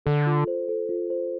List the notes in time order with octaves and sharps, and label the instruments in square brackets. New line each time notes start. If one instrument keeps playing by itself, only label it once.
[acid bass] D3 [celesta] A4
[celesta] F4
C5
A4
F4
C5